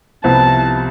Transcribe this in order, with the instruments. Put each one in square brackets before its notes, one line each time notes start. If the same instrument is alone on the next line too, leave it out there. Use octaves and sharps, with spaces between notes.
[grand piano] C2 C3 F3 B3 E4 [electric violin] A5